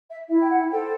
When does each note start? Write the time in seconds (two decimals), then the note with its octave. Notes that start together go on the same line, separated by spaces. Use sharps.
0.09 E5
0.29 E4 E5
0.41 G5
0.50 F#5
0.70 A4 C5 G5